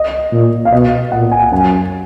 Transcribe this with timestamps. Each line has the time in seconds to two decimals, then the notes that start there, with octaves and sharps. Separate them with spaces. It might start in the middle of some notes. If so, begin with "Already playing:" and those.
Already playing: D#5
0.32 A#2
0.65 F5
0.72 B2 D#5
1.12 A#2 F#5
1.32 G#5
1.51 F#2 G#5